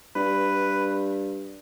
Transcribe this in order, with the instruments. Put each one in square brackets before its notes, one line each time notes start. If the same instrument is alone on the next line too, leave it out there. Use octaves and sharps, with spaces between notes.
[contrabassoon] G2 [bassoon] B4